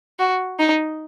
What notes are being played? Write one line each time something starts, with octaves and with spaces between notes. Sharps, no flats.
F#4
D#4